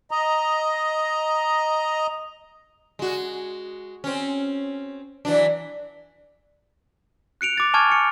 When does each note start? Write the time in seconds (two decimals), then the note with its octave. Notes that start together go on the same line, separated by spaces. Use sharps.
0.11 D#5 A#5
2.99 G#3 F#4
4.04 C4 C#4
5.25 E3 F#3 D4
7.41 F#6 C#7 D7 F7
7.58 D6 A6
7.74 G#5 A5 C#6 D6 F6 G#6
7.90 G#5 C#7